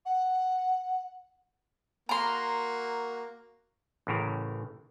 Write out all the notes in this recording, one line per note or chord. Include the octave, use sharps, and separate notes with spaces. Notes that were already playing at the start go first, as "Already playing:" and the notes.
F#5
A#3 F#4 A#4 A#5 C6
A1 A2 C#3 A#4